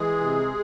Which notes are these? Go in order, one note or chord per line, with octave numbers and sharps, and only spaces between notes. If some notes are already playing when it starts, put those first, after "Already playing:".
Already playing: E3 G#3 G#4
C3